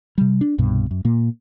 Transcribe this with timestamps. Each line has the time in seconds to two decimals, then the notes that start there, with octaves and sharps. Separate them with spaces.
0.18 C3 G3
0.41 D4
0.58 C2 G2 B2
0.91 F#2
1.05 A#2 A#3